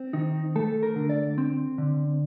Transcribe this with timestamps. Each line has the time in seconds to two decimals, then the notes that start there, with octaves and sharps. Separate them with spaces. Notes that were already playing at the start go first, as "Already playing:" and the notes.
Already playing: C4
0.13 D#3 D#4
0.56 A3 A4
0.83 A#4
0.96 D3
1.09 D5
1.38 C4
1.78 D3